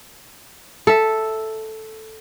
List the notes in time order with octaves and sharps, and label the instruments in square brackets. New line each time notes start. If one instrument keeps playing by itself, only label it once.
[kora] A4 E5